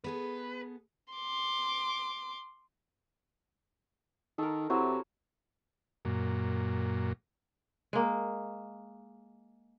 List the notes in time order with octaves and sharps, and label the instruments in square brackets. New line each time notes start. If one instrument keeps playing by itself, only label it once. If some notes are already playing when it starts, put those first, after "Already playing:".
[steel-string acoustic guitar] B3 G#4 A4 [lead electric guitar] B4
[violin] C6 D6
[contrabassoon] D#3 [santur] A4 A#4
[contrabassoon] C3 [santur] F#3 E4 C5
[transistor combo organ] F#2 A#2
[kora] G#3 A#3